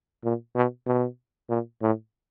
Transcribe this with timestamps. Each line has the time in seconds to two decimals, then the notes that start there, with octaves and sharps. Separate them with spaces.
0.24 A#2
0.56 B2
0.87 B2
1.50 A#2
1.82 A2